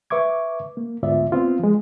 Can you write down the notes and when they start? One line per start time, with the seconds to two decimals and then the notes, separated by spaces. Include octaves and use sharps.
0.10 B4 E5 C#6 D6 G#6
0.77 A#3
1.03 D2 G#2 B3 F4 D5 E5
1.32 B3 C4 F4
1.59 F3 G#3